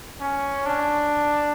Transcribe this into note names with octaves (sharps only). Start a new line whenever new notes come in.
C#4
D4